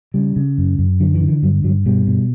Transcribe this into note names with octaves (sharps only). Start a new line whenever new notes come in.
C#3 G3
C#3
F#2
F#2
D3 F#3
E3
D3
E3
G2 F#3
G2 F#3
B2 G3
B2